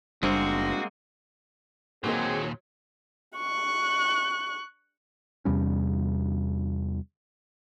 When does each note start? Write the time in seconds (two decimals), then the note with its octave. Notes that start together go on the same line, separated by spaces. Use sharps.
0.23 F#1 G3 G#3 A#3 C4 D4 F#4 C5
2.04 D#2 A#2 F#3 A#3 C4 D#4 G#4 A#4
3.37 C#6 F#6
5.45 E2 C3 G3 C#4